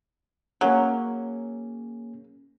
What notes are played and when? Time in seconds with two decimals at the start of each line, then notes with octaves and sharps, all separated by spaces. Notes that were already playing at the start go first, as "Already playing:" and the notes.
0.61 F#3 A#3 C#4 G#4